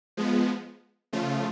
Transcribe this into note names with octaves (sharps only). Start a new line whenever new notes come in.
F3 G#3 B3
C#3 F3 A3 F4